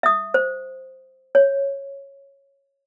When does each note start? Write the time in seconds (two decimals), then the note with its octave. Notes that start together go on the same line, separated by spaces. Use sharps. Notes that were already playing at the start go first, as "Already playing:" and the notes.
0.03 E5 D#6
0.34 C5
1.35 C#5